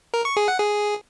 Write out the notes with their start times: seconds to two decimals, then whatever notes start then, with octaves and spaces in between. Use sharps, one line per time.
0.14 A#4
0.25 C#6
0.37 G#4
0.48 F#5
0.60 G#4